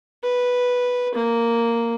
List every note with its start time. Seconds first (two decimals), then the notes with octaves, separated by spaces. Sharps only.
0.23 B4
1.15 A#3